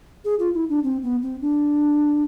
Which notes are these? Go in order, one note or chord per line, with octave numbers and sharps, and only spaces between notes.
G#4
F4
E4
D4
C4
B3
C4
D4